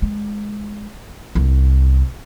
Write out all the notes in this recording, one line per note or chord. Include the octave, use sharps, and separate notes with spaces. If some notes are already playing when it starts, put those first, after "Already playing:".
G#3
C2